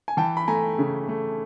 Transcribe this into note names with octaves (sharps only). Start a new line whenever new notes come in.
G#5
E3 G5 A5
B5
A3 G#5 A#5
C#3
A3